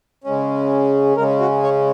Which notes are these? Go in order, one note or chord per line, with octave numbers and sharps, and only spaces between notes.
C#3 G#3 C#4
C#3 G#3 C#4 A#4
F#4
C#5